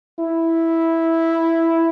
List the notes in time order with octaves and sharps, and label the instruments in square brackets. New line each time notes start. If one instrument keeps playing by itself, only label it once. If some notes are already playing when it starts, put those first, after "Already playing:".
[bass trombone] E4